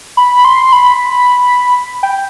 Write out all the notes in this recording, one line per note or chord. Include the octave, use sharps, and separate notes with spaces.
B5
C6
B5
G5